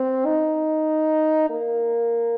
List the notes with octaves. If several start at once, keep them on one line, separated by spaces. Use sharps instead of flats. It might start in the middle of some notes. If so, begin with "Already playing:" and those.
Already playing: C4
D#4
A#3